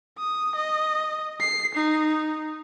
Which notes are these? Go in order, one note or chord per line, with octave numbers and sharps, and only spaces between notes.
D#6
D#5
C7
D#4